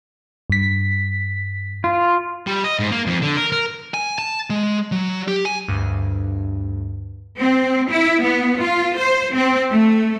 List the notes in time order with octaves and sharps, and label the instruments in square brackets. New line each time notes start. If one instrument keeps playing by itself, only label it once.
[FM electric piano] G2 B6
[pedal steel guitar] F4
[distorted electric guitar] G3
D#5
G#2
A#3
F2
D3
A#4
A#4
[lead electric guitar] G#5
A5
G#3
F#3
G4
G#5
[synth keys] D2 G2
[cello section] C4
E4
B3
F4
C5
C4
A3